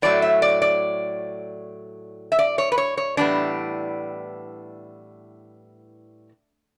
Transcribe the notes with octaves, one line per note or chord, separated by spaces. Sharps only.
A2 F#3 A3 D5
E5
D5
D5
E5
D5
C#5
B4
C#5
C#5
A2 E3 G3 B3 D4